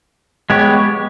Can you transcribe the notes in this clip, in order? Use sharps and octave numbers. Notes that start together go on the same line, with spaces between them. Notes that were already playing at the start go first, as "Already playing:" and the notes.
G#3 B3 G4 C#5